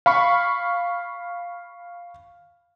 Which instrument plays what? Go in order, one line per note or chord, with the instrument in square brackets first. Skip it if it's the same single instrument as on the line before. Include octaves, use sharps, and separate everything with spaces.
[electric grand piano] F5 B5 C#6